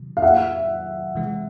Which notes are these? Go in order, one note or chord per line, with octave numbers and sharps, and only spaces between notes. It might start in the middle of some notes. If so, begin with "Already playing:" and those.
Already playing: C3 D#3 F#3
F5
E5 F#5
C3 E3 G#3